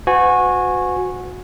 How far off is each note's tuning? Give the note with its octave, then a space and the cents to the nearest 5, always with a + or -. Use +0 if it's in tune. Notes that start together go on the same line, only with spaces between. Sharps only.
F#4 -20 B4 +45 G#5 +0